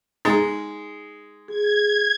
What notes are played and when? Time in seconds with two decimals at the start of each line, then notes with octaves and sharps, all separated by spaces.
0.25 G#3 D#4
1.48 G#4 G#6